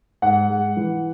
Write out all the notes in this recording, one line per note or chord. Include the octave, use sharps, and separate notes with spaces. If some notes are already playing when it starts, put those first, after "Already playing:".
G#2 F#5
G#3
E3